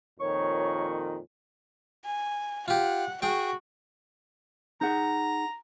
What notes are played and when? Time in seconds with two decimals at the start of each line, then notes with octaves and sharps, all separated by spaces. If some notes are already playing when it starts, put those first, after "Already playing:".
0.20 F2 A#2 D#3 C#5 C#6
2.06 G#5
2.68 F4 G4 F#5
3.22 F#4 G#4 G5
4.81 D#4 G#4 F#5 A#5